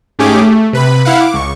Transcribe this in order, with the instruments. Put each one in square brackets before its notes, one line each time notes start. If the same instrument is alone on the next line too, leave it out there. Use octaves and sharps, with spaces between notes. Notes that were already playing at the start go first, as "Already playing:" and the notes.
[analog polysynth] G#2 A3 C#4 G4 G#4 D6
A3
C3 B4 B5
E4 F5 F#5
D6
C#2 C#6